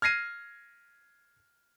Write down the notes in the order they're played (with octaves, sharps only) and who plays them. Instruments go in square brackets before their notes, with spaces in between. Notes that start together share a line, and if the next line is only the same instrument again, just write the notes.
[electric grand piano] F6 G#6 A#6 C7 D#7